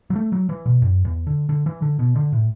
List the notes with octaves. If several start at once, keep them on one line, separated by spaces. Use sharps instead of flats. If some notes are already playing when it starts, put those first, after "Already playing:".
F#3
A3
F#3
E3
B2
F#2
E2
D3
D3
E3
D3
B2
D3
A2